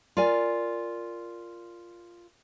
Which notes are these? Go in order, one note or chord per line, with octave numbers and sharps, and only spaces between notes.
F4 A#4 D5 G#5